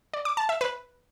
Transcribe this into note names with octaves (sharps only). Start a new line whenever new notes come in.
D5
D6
A5
E5
B4